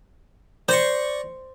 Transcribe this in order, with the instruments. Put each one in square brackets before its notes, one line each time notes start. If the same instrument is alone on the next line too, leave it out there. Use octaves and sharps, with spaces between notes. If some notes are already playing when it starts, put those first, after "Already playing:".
[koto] C5 [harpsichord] D5 A#5 C#6